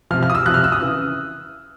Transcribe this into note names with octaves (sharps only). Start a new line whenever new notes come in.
C3 F3 F6
F6
D#6
E6
C3 F3 F6 F#6
E6
D#6
C#3 E3